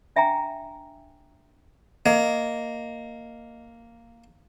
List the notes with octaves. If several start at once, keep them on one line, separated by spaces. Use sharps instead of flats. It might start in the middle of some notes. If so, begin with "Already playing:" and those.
D4 E5 G5 G#5 A#5
A#3 D#5